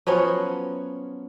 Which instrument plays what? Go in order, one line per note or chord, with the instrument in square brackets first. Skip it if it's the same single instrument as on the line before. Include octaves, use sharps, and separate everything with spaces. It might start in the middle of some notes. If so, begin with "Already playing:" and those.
[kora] F3 F#3 B3 C#4